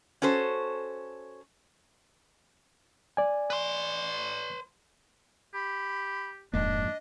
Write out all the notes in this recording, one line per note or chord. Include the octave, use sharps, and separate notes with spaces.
C#4 F#4 A4 C5
D5 G#5
B4 C6
G4 B5
D#1 F2 G#2 A#3 D4 D#5